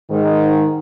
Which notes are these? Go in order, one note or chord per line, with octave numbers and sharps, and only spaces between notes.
G#2 D#3